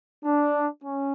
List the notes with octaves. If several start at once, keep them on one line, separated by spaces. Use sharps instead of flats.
D4
C#4